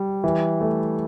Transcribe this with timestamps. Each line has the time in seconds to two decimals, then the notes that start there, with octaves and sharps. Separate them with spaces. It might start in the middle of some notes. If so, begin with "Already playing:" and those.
Already playing: G3
0.24 E3
0.61 A3